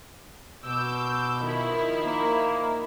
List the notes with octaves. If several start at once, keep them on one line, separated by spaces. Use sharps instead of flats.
B2 D6 E6 G6
D#3 F3 E4
A#3